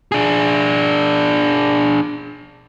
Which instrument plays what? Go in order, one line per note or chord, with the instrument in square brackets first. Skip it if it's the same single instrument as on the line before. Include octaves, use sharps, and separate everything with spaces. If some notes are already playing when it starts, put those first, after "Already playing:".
[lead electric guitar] D4 G#4